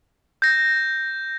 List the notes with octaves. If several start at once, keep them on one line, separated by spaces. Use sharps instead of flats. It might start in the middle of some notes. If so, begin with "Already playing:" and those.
G6 A#6